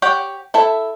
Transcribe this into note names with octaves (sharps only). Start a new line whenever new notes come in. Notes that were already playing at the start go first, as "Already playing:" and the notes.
G4 C#5 F#5 G5
E4 A4 E5